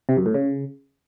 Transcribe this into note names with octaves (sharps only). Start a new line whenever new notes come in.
C3
F#2
A2
C#3